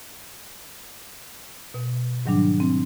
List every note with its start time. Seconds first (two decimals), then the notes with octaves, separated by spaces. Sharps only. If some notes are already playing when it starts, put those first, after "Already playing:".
1.74 B2
2.26 G#2 D#3 F#3 G3 D4
2.60 C4